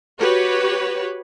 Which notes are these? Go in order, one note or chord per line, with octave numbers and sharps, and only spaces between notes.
F#4 G4 B4 C#5